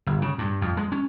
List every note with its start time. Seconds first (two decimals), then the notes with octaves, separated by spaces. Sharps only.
0.06 G1
0.22 C#3
0.38 G2
0.61 F2
0.77 G#3
0.92 C#4